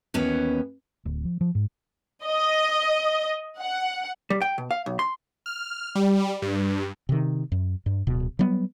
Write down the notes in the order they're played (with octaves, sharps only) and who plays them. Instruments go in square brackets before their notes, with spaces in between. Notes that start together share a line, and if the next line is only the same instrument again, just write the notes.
[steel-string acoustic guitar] D#2 E3 B3 C#4
[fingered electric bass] D1
F3
F3
G#2
[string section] D#5
F#5
[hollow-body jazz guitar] G3
G5
B2
F5
B1
C6
[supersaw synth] F6
G3
G2
[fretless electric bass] C3 D#3
F#2
G2
D1 B2
F#3 G3 B3